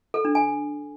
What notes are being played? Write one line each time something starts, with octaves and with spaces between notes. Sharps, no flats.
A4
D4
G#5